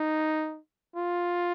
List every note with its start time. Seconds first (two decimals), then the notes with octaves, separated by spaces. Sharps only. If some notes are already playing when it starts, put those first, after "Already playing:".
Already playing: D#4
0.96 F4